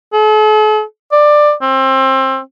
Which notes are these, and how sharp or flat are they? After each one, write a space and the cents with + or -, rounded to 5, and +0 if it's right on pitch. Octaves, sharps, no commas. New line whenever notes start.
A4 -45
D5 +15
C4 +25